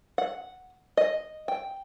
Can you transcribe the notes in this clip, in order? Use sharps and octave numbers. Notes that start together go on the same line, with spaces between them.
F#5
D#5
G5